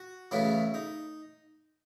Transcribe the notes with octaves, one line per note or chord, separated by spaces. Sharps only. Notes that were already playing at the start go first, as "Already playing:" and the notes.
Already playing: F#4
E2 C#3 F#3 A3 C#4 E4
D#4